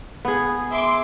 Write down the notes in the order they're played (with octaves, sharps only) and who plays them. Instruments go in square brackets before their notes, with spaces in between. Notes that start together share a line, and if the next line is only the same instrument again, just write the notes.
[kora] B3 G#4
[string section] E5 C6 D6